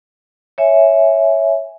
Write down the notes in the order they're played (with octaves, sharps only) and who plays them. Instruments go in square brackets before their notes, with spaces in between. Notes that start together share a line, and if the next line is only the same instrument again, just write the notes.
[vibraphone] C#5 E5 G#5